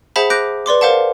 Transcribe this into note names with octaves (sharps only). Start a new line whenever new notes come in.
G#4 C5 E5 F#5 A5 B5
D6 F#6 G6 A#6 D7
B4 D5 C6 D6
A#4 C5 F5 F#5 A5